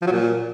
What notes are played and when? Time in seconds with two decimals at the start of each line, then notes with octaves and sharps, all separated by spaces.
0.02 F3
0.07 F#3
0.12 A#2